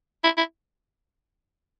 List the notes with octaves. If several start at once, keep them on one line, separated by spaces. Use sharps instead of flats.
E4
E4